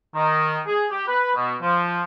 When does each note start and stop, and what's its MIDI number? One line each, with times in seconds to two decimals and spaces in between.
0.15 0.58 51
0.66 0.84 68
0.91 1.03 67
1.08 1.32 71
1.36 1.54 47
1.62 2.03 53